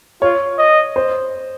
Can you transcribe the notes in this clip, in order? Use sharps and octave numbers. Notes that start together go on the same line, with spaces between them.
F4 C#5
D#5
C5